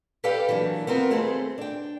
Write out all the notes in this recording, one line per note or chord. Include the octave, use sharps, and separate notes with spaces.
G4 A4 B4 D5 F5 G5
E3 F#3 A#3 D4
B3 C4 F4 A#4
D#2 A3 C4 G#4 A4 C5
D4 G5